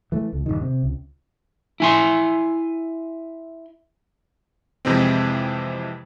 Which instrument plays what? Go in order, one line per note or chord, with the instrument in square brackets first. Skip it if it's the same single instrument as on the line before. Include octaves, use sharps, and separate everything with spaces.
[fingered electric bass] E3 A3
C#2
D#1 E2 G2 D#3
C3
C#2
[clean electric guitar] E4 G#5 C6
[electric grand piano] F2 C3 E3 G#3 C4